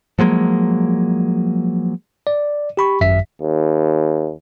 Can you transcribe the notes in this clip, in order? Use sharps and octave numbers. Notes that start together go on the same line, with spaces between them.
F3 F#3 G#3 A#3
D5
G4 B5 C#6
G#1 F#2 E5 B6
D#2